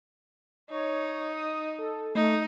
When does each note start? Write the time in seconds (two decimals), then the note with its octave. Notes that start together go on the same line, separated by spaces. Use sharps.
0.70 D#4 C#5
1.33 D#6
1.79 A4
2.15 A3 D#4